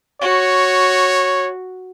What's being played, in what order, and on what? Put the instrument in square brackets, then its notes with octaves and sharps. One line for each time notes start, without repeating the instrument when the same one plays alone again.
[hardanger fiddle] F#4 [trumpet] C#5